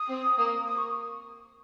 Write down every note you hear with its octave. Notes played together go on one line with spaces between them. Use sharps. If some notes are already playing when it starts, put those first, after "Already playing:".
Already playing: D#6
C4
A#3
D#6
C#6